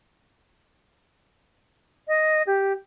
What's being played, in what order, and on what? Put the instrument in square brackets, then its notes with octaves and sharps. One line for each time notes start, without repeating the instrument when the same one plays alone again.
[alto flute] D#5
G4